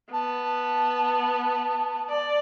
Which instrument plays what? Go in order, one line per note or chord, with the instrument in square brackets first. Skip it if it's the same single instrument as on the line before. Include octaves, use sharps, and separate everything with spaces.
[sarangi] B3 [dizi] A5
[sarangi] D5